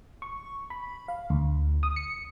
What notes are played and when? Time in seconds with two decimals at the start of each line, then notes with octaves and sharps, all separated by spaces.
0.22 C#6
0.70 B5
1.08 F5
1.30 D2
1.83 D#6
1.96 C#7